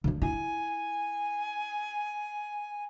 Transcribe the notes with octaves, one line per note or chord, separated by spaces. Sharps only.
D3 F3
E4 G#5